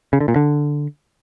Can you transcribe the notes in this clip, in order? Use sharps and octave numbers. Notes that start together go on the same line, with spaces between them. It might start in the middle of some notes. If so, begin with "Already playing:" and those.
C#3
D3
A#2
D3